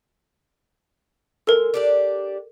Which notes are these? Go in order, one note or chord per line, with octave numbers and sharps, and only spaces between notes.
G#3 A4 A#4
D4 G4 D5